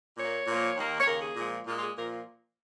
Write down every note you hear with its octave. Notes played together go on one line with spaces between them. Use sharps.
A#2 A#3 C#5
A#2 F3 A#3
D#2 D#3 A#3
C#5
D#2 C#3 A#3 A#4
G#4
A#2 F3 G#3
A#2 G#3 F4
F4
G#4
A#2 F3 A#3 A#4